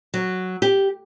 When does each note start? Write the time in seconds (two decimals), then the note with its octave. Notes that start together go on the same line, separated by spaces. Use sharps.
0.14 F#3
0.62 G4